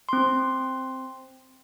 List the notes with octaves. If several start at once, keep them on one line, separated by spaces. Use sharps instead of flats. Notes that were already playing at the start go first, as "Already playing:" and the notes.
C4 C6